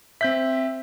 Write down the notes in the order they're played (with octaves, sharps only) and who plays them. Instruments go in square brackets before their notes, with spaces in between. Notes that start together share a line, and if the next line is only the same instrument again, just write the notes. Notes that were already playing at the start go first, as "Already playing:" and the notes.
[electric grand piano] C4 G6 B6 [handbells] E5